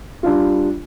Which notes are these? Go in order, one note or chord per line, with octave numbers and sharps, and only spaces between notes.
G3 D4 F4